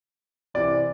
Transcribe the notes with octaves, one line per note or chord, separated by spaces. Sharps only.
C2 C3 E3 D5